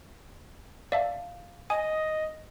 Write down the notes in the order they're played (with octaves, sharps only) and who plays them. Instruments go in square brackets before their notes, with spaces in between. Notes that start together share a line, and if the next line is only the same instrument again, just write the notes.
[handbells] D5 E5 A5 [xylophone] F5
[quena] D#5 [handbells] G#5 [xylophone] D#6